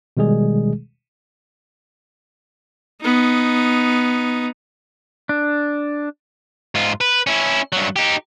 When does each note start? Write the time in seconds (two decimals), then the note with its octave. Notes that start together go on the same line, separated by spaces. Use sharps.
0.17 B2 D#3 G3 G#3 G#4
3.01 B3 D#4
5.29 D4
6.75 G#2 F4
7.01 B4
7.27 C#4 E4
7.73 G2 F#3
7.96 D#4 G4